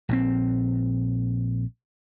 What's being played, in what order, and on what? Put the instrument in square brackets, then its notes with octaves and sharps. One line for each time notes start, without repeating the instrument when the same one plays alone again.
[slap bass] A#1 D#3 C4